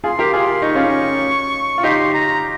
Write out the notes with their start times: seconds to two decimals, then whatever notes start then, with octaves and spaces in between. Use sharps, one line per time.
0.04 F4 G#4 C6
0.19 G4 A#4
0.33 F4 G#4 C6
0.49 F4
0.62 D#4 C#6
0.75 C#4 F4
1.78 F4
1.83 D#4 G4 C6
2.14 A#5